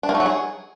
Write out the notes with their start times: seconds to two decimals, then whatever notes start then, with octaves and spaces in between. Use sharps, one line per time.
0.03 D4
0.09 A#3
0.14 A3
0.20 F#3
0.26 G#4